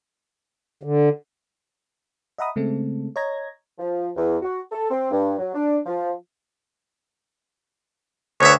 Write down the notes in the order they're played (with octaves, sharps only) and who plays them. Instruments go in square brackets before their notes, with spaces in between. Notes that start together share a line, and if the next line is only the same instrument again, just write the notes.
[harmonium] D3
[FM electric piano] D#5 E5 F#5 A#5 B5 D#6
C#3 G#3 A3 C4 A4
C#5 D#5 A#5 G#6 A#6
[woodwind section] F3
E2
F#4
A4
C4
G2
F#3
D4
F3
[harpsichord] D2 B3 E5 [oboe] C#5